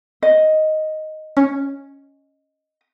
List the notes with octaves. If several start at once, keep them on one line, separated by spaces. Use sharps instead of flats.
D#5
C#4